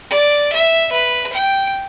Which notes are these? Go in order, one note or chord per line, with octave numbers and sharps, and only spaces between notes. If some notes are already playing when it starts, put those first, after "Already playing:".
D5
E5
B4
G5